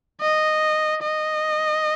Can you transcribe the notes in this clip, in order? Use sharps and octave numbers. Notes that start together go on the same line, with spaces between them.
D#5
D#5